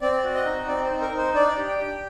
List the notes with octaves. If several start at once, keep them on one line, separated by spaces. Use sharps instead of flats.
C4 D5
F#4
D#5
D#4
C4 D5
C5
D#4
A#4
D#4
C5
D4 D5
G4
G5
G4